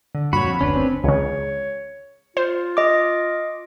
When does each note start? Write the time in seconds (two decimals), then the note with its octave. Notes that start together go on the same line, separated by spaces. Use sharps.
0.15 D3
0.33 G2 A#2 F#4 C#5 B5
0.44 F2
0.61 F#1 D2 C#4 D4 B4
0.76 C4
1.04 C#2 C#3 C#5
2.37 F4 C5
2.77 D#5 D6